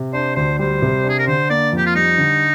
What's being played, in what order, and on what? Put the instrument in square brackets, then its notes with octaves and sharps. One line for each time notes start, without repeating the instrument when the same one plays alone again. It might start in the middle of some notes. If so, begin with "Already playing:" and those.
Already playing: [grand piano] C3
[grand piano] D4 [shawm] C5
[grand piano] D2 [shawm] C5
[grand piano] G3 [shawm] C5
[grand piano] C3
D4
[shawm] G#4
A#4
[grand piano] D3 [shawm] C5
[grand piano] A#3 [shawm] D5
[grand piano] F2 [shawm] G4
[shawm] F4
[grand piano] G3 [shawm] D#4
[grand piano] D3